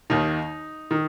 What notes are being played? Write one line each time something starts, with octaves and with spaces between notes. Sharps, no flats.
D#2 D#3 D#4
D#3